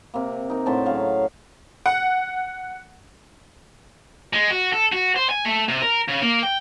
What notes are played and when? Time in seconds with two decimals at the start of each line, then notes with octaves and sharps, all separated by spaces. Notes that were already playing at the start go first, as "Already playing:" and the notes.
0.14 C3 A#3
0.50 D#4 A#4
0.66 A2 D3 C4 A5
0.86 C#3 F#3 F5
1.86 F#5
4.33 G#3
4.51 F#4
4.73 A4
4.92 F#4
5.16 C5
5.30 G#5
5.45 A3
5.68 C3
5.82 A#4
6.08 C#3
6.22 A#3
6.43 G5